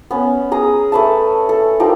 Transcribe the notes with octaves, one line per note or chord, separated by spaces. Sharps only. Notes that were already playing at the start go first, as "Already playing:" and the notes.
B3 C#4
G#4 A#5 D#6
A3 B4 A5
A4
F3 D#4 G4 A#4